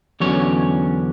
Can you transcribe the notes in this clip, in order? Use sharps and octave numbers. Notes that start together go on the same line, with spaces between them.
E2 D3 F#3 C#4 C#5